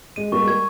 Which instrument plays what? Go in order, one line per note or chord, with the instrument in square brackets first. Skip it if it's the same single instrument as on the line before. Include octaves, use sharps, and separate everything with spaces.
[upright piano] G#3 [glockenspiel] D#7
[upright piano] G3 A#3 [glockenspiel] C#6
[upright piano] G#3
[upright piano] G3 A#3 [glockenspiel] G#6